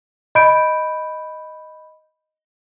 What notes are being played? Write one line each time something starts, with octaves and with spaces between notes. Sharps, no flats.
D#5 B5 G6 D7